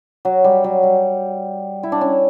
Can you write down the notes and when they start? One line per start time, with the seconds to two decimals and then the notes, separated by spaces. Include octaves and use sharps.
0.25 F#3
0.44 G3
0.64 F#3
0.83 G3
1.83 E4
1.92 D4
2.01 C#4